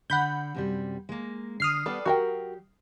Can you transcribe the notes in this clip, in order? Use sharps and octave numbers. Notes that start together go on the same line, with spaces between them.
D3 F#5 B5 G6
F#2 C3 G3
G#3 A#3
D3 D#6 F6 C7
G3 B3 A4 B4 D5
F#3 F#4 G4 A#4 G5